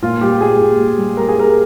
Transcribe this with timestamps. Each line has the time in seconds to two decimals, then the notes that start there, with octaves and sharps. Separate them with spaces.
0.02 A#2 F4
0.21 G3 G4
0.41 A#2 G#4
0.60 A#2
0.79 G3
0.97 G3
1.17 G3 A#4
1.28 G#4
1.36 G3 A#4